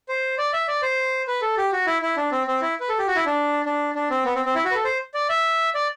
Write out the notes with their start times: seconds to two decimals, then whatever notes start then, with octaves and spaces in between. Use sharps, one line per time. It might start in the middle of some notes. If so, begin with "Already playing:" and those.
0.09 C5
0.38 D5
0.53 E5
0.68 D5
0.82 C5
1.27 B4
1.42 A4
1.57 G4
1.72 F#4
1.86 E4
2.02 E4
2.17 D4
2.32 C4
2.47 C4
2.61 E4
2.80 B4
2.89 A4
2.98 G4
3.07 F#4
3.15 E4
3.26 D4
3.66 D4
3.95 D4
4.10 C4
4.25 B3
4.35 C4
4.46 C4
4.55 E4
4.65 F#4
4.71 B4
4.75 A4
4.85 C5
5.14 D5
5.29 E5
5.74 D5